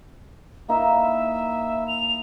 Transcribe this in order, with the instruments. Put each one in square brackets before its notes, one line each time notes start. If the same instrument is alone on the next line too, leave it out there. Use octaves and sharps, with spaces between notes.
[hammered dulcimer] A#3 D#4 E4 [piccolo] E5
[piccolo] F7